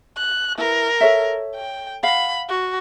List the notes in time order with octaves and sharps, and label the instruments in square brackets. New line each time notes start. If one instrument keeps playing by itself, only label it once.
[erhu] F#6
[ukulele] E4 B4 [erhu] A#4
[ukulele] A4 C#5 E5
[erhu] G5
[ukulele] F5 F#5 [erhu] B5
[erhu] F#4